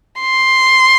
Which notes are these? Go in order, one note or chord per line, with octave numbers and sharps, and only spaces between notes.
C6